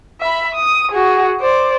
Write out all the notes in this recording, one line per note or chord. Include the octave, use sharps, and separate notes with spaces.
E5 B5
D#6
F#4 G#4
C5 D5